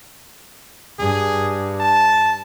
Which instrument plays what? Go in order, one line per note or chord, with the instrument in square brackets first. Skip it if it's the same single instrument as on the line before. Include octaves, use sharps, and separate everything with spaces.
[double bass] G2 [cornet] G#4
[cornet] A5